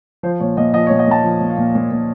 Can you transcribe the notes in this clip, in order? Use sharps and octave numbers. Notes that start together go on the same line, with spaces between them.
F3 C5
A#2 C#5
A#2 D#5
F3 D#5
C#5
A#2
D#5
A#2 A5
F3
A#2
F5
A#2
A#2
A#2